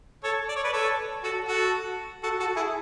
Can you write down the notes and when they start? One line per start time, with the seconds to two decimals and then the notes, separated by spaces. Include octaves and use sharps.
0.24 A4 C#5
0.49 D5
0.56 C#5
0.64 B4 D5
0.73 A4 C#5
1.23 F#4 A4
1.48 F#4 A4
2.23 F#4 A4
2.40 F#4 A4
2.56 E4 G#4